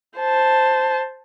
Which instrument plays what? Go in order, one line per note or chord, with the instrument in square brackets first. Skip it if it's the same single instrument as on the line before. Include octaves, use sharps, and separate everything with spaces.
[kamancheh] C5 A5